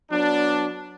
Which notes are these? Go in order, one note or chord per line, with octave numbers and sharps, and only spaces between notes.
F#3 B3 D4